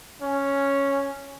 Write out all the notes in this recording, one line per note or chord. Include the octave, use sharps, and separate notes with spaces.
C#4